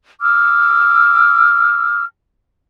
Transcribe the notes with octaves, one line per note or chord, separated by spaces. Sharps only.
D6 E6 F6